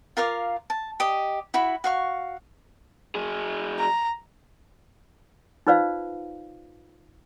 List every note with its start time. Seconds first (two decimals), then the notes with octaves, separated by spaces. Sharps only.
0.17 F4 A#4 F5 D6
0.70 A5
1.00 G4 D#5
1.54 E4 F#4 B5
1.84 F#4 F5 C#6
3.15 F#3 G#4
3.79 A#5
5.67 D#4 F4 B4 C5 D5 F5